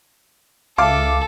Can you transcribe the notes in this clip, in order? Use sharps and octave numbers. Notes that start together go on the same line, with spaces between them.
C#2 A4 E5 F5 A5 D6